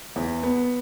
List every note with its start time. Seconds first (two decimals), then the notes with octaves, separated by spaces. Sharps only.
0.16 E2
0.43 B3